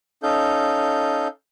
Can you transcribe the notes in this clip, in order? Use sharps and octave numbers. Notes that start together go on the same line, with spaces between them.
C#4 D#4 A4 F5 G6